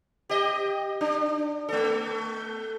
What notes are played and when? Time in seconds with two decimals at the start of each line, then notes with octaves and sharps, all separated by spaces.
0.29 G4 D#5
1.01 D4
1.69 A3 A4